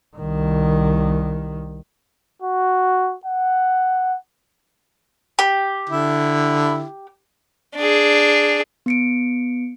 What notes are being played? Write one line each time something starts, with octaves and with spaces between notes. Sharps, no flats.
C2 D#3
F#4
F#5
G4
D3 E4
D4 G#4
B3 C#7 D7